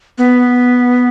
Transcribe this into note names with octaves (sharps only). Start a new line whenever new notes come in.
B3